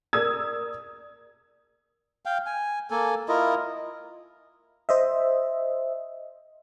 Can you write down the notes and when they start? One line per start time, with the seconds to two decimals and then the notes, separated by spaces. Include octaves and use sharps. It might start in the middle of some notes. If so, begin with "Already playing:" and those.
0.13 A#4 D5 D#6 E6 G#6
2.26 F5 G5
2.46 G#5
2.91 A#3 A4 G#5
3.28 E4 F4 A#4 D#5
4.89 C5 D#5 E5